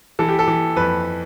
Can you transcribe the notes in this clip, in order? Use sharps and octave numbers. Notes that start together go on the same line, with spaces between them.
E3 A4
G4
A4
E3
F2 B4